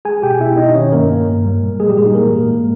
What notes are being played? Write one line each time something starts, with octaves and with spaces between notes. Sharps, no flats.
G#3 G#4 G#5
B2 G4 G5
B3 E4 E5
B2 D#4 D#5
D#3 C#4 C#5
G2 A#3 A#4
A#3
G2
G3
A#2
G#3 A#3 G#4
G3 G4
A#2 G#3 G#4
D#4
E3 A#3 A#4
G#2
G#3